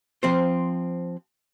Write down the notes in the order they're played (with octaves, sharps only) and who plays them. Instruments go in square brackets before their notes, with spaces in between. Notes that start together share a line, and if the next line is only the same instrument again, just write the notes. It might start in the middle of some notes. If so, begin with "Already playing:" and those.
[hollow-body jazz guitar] F3 C4 C5